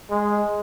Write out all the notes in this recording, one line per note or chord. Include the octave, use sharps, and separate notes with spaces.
G#3